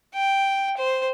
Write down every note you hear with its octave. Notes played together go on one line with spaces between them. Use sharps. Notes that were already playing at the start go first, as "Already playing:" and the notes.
G5
C5